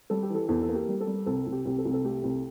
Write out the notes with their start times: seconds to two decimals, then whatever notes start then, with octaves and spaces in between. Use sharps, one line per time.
0.10 G3 A4
0.23 G4
0.30 E3
0.35 A4
0.49 E2 A4
0.62 A4
0.69 A#3
0.75 G4
0.88 G3
1.00 A4
1.07 G3
1.26 C2 A4
1.46 C2
1.52 G4
1.65 C2 G4
1.78 A4
1.85 C2
1.94 A4
2.04 A3 G4
2.23 C2